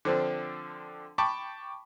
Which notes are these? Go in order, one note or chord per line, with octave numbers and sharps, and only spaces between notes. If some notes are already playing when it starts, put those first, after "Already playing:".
D3 F3 C4 D4
G5 A5 B5 C#6 D6